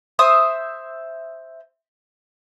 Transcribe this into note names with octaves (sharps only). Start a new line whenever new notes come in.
C5 E5 D#6